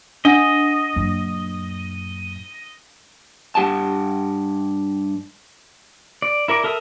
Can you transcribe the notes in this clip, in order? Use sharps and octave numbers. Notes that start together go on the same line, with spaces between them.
D4 D#5 F#5
F#2 A#2
G2 G4 F#5 A5
D5
E4 A#4 D5 D6
A4 A#4 E5 D#6 E6